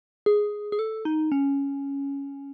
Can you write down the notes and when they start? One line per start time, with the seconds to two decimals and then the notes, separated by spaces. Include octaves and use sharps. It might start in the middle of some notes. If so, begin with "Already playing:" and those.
0.26 G#4
0.72 G#4
0.79 A4
1.05 D#4
1.32 C#4